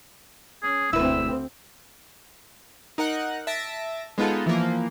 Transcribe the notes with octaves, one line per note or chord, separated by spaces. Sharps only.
C#4 G#4
E1 D2 C4 E4 B4 E6
D#4 A#4 F#5 F#6
E5 A5 A#6 D7
G#3 B3 D#4 F4 A4
E3 F3 A#3